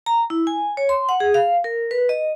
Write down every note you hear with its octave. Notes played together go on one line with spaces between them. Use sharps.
A#5
E4
G#5
C#5
C6
F#5
G#4
F5
A#4
B4
D#5